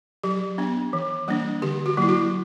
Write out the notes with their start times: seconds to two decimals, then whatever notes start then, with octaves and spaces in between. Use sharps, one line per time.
0.23 F#3 G4
0.58 B3 D4
0.93 E3
1.28 G3 A#3 D4
1.62 D3 G4
1.86 F#4
1.97 F#3 A#3 E4
2.09 F#4